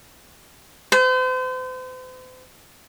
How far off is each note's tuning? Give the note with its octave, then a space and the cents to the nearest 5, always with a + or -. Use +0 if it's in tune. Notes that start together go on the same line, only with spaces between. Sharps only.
C5 -40